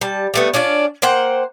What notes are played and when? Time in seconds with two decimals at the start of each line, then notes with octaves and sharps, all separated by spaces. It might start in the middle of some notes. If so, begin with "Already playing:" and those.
0.01 G3 A5
0.34 G3 A3 B3
0.54 C#4 D4 F4 D5
1.02 A#3 C5 F#5 G5